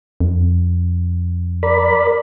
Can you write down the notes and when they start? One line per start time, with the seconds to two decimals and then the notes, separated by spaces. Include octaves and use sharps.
0.20 F2
1.63 A#4 D5 B5